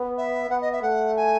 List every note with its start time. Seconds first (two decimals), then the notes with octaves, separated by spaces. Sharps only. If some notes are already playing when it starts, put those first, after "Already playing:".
Already playing: B3
0.18 E5
0.50 B3 F#5
0.61 D#5
0.72 E5
0.82 A3 F#5
1.16 G#5